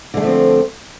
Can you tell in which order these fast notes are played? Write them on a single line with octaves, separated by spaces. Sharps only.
D3 G#3 A3 F3 C4